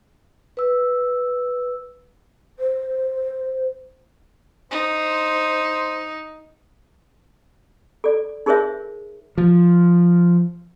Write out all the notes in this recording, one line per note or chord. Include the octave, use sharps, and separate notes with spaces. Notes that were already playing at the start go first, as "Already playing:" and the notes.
B4 E6
C5
D#4 C5
A4 D5
D#4 G#4 A#4 C5 C#5 E5
F3